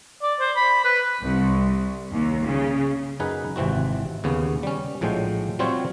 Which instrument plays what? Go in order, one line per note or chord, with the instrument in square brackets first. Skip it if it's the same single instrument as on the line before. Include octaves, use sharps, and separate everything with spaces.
[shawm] D5
C5
B5
B4
[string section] C2
D#2
C#3
[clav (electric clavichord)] F#2 D#4 G#4 B4 F#5
G#1 C3 E3 C4 F#4
D#2 C#3 B3 C#4
G3 C#4
A#1 A2 F3 F#3 G#3 G5
F#3 G3 C4 F4 C5 C#5